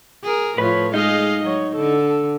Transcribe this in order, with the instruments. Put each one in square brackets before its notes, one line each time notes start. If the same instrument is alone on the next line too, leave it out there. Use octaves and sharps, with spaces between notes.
[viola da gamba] G#4 A#4
[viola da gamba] A2 F4 [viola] F3 C#5 [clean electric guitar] B4
[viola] G#3 F5 [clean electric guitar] D#4 [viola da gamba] G#4 D#5
[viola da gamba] F#3 [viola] C#5
[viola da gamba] D3 [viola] A4